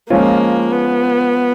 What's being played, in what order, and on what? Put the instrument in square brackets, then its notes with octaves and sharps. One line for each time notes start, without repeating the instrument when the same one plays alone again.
[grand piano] F3 G#3 C#4 F4 [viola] A#3
[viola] B3